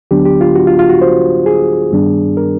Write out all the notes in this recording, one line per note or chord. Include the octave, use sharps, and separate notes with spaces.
D2 D3 F#3 B3 D4 G4
G4
F4
F#4
F4
F4
F#4
C5
G#4
G2 D#3 G3 B3 D4
A#4